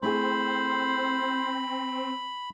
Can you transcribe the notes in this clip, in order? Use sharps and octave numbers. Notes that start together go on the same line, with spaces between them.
A3 C4 E4 G#4 C5 B5